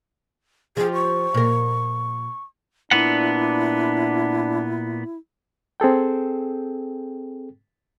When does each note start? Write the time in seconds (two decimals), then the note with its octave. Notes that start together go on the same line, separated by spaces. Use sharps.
0.77 F3 G4 G#4
0.94 C#6
1.34 A#2 A#4
2.91 A#2 B3 D4 E4 F#5
5.80 C4 G#4 A4 G5